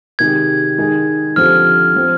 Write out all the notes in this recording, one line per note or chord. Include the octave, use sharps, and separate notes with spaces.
C3 D#3 G#3 D#4 G4 G#6
D#3 G#3 D#4 G#4
D3 F3 C4 G4 F6
F3 C4